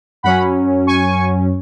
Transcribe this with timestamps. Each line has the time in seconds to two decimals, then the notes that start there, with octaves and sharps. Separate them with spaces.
0.23 F#2 F#3 C#4 F#5 B5
0.87 G#5 C#6